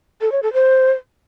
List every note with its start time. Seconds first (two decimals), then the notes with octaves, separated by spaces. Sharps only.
0.21 A4
0.32 C#5
0.43 A4
0.53 C5